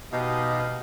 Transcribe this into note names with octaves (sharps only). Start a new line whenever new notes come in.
B2 D#4 G4 D#5 F5